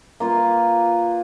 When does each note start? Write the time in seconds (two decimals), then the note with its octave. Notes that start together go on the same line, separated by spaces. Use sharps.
0.20 A#3 F4 B4